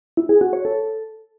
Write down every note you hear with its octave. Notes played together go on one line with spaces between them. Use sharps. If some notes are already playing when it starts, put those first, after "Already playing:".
E4
G#4
F#4
C#5
A4